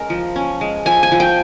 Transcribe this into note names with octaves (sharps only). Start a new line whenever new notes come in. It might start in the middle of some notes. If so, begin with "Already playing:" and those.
Already playing: G#3 C#4 A#4
F3
C#4
G#3
F3 G#5
G#5
F3
G5